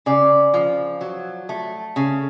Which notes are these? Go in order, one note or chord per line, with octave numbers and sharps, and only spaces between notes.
C#3 D5
F3
F#3
A3
C#3